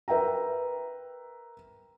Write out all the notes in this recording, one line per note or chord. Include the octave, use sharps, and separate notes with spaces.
A#4 B4 E5 G5 A#5